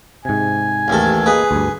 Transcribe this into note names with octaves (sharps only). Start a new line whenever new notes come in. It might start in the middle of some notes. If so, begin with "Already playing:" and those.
G#2 C3 G#5
A1 D#2 A4
A#3 G#4 B4 D#5
D2 G2